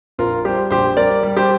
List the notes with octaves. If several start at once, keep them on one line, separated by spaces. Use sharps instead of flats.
A#1 F4 A#4
G3 G4 C5
A#1 G4 C5
G3 A#4 D5
G3
G4 C5